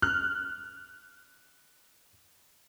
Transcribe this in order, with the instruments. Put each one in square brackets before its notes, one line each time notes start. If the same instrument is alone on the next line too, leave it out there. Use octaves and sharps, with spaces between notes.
[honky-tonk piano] F6 F#6